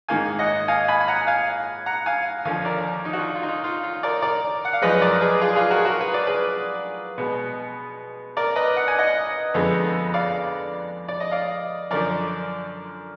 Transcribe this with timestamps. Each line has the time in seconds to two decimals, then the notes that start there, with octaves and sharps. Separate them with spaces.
0.08 G#2 D#3 A#3 F5 G#5
0.39 D#5 F#5
0.68 F5 G#5
0.88 G#5 B5
1.01 G#5
1.08 F#5 A#5
1.27 F5 G#5
1.86 F#5 A#5
2.06 F5 G#5
2.45 D#2 D3 F3 F5 G#5
2.65 A#4 D5
3.05 D#4
3.13 F#4
3.19 F4
3.35 F4
3.43 D#4
3.48 F4
3.64 F4
3.83 F4
4.03 A#4 D5
4.22 A#4 D5
4.65 F#5
4.73 F5
4.82 F#2 F3 G#3 B4 D#5
5.02 A#4 D5
5.21 G#4 B4
5.41 F4 G#4
5.55 F4 G#4
5.70 F#4 A#4
5.78 G#4
5.85 F#4 A#4
6.01 B4
6.14 D5
6.27 G#4 B4
7.18 B2 G#3 B3
8.37 A#4 D5
8.56 B4 D#5
8.76 F#5
8.88 G#5
8.99 D#5 F#5
9.54 F2 D3 G#3 B3
10.14 D5 F5
11.08 D5
11.20 D#5
11.31 D5 F5
11.91 F#2 D3 F3 A#4 D5